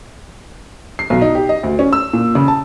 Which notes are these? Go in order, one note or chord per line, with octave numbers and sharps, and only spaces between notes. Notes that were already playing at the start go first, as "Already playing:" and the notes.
C7
B1
D#4
G4
D#5
D2
C#4
E6
A#2
C#3
A5